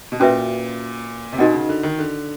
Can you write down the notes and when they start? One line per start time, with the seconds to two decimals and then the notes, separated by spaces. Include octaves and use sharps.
0.12 B2
0.20 A#2 C#4 F#4 B4 E5
1.33 C3
1.38 B2 D#4 F#4 A#4 D#5 F#5
1.54 C#3
1.69 D3
1.83 D#3
1.99 D3